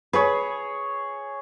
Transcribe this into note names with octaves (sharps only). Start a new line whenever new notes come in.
G#4 B4 C#5